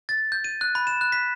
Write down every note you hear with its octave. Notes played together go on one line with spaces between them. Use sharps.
A6
G6
D#7
F#6
B5
E7
F#6
B6